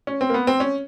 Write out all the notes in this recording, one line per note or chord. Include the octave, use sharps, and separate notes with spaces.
C#4
C4
A#3
B3
C4
C#4